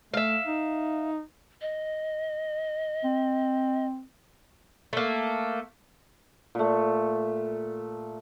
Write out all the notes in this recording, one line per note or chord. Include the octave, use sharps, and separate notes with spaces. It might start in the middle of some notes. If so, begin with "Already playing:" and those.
A3 E5 F5
D#4
D#5
C4
A3 A#3
A#2 A3